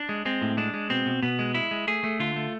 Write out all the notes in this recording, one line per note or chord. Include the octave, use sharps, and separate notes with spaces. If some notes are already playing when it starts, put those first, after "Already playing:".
Already playing: D4
G#3
G#3 C4
A2
G#3 D4
G#3
B2 C4
B2
B2 B3
G#3
G#3 E4
G#3
A3 G#4
A3
D3 F4
A3